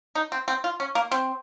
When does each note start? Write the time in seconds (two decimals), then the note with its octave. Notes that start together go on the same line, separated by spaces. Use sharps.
0.15 D#4
0.32 C4
0.48 C4
0.64 F4
0.80 C#4
0.95 A#3
1.11 C4